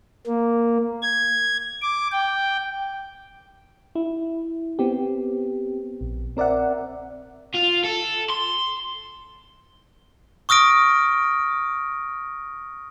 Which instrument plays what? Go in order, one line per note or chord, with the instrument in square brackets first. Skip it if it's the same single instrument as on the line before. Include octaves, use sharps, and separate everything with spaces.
[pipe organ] A#3
G#6
D6
G5
[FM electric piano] E4
B3 C4 G4
A#1
C4 A#4 D5 E5 F#5
[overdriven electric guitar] F4
A4
C6
[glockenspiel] C#6 D#6 F6 A#6 D7